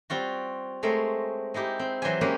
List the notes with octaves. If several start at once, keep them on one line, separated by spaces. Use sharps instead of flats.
G3 C4 F4 F#4
G#3 A3 C4 A#4 C#5
G#3 D#4 E4 G4
C4
E3 F#3 C5 D5 E5 G#5
G#3 A#3 C#4 G4 B4 G#5